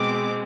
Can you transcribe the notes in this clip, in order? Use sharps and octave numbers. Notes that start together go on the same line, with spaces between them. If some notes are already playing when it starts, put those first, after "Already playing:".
Already playing: B2 G#3 C4 D6